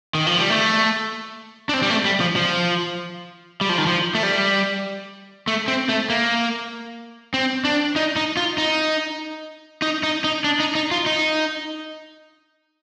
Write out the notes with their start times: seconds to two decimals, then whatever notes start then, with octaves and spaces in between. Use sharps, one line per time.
0.15 D#3
0.27 F3
0.38 G3
0.50 A3
1.69 D4
1.74 C4
1.82 G3
1.90 A3
2.05 G3
2.20 F3
2.36 F3
3.61 G3
3.69 F3
3.78 D#3
3.86 F3
4.15 A3
4.23 G3
5.47 A3
5.68 C4
5.89 A3
6.10 A#3
7.34 C4
7.65 D4
7.96 D#4
8.16 D#4
8.37 F4
8.58 D#4
9.82 D#4
10.03 D#4
10.24 D#4
10.44 D4
10.60 D#4
10.75 D#4
10.91 F4
11.06 D#4